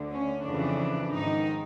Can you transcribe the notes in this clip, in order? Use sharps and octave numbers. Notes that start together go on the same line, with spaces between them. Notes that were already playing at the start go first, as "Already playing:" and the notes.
Already playing: D2 D3
C#4
F2 C#3 E3 D4
G#2 D#3 D#4